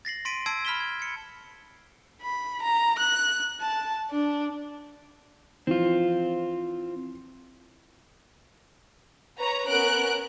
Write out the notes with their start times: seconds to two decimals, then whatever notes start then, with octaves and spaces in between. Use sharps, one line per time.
0.05 A6 A#6 C7 F#7
0.25 C6 A6 B6 D7 D#7
0.46 A5 E6 G#6 C7 D7
0.65 B5 F6 G#6 B6 E7 G7
0.80 G#6
1.00 G#6 C#7
2.22 B5
2.62 A#5
2.98 F#6
3.61 A5
4.10 D4
5.67 E3 F3 C4 F4
9.38 B4 C#5 A#5
9.68 B3 C#4 A#4 F#6 D7